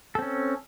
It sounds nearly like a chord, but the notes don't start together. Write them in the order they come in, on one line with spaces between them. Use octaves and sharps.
A4 C4 C#4